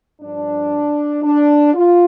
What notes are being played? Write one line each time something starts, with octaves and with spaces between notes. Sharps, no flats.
G2 F3 D4
D4
F4